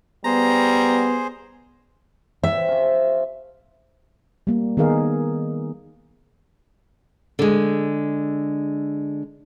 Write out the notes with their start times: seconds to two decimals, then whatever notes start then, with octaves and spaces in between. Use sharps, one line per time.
0.25 G3 B3 G#4 C5 A#5
2.43 C3 E5
2.68 F3 C#4
4.47 G3 A#3
4.77 D#3 B3 D#4 G#4 A#4 F5
7.39 D3 G#3